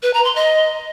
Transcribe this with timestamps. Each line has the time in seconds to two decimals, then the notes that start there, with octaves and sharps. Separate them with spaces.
0.03 B4
0.14 A#5
0.24 C6
0.35 D#5